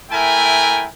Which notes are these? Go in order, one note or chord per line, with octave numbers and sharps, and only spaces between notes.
A3 E4 A#4 G5 G#5